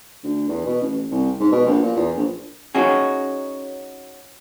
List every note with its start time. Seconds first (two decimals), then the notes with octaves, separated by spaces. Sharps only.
0.23 D2
0.48 E2
0.66 B2
0.81 A1
1.11 C2
1.40 G#2
1.52 B2
1.66 A#1
1.83 A#2
1.96 E2
2.15 A#1
2.75 C#4 D#4 F#4 G#4